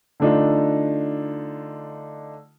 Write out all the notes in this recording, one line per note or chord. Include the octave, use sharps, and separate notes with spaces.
D3 A3 D4 D#4 F4